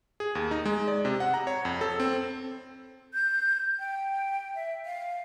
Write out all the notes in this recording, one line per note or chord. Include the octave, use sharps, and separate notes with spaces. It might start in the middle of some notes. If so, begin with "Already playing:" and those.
G#4
D#2
D#4
G#3
D5
C3
F#5
A#5
C#5
F2
A4
C4
G6
G5
E5
F5